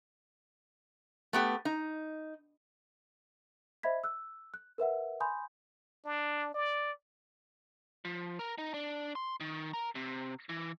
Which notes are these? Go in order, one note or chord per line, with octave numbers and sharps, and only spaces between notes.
A3 B3 G4
D#4
C5 D#5 E5 B5 G#6 B6
E6 F#6
F#6
A#4 B4 E5 F#5
G#5 B5 C6 D#6 G6
D4
D5
F3
A#4
D#4
D4
C6
D#3
A#4
C3
E3